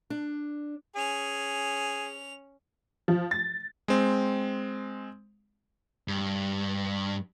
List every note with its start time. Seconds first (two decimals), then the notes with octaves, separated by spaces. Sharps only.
0.10 D4
0.96 C#4 G#4 F7
3.08 F3
3.31 A6
3.88 G#3 C4
6.08 G2